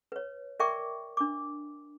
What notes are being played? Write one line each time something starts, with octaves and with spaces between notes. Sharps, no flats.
B4 C#5
A#4 D5 E5 G5 C#6 D6
D4 D6